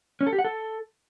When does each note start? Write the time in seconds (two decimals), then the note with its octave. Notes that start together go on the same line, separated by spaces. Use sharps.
0.21 C#4
0.27 A4
0.33 G4
0.39 F#5
0.44 A4